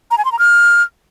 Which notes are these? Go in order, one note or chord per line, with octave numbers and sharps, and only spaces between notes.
A#5
G#5
C6
A#5
F6